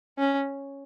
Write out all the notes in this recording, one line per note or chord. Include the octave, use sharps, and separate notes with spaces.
C#4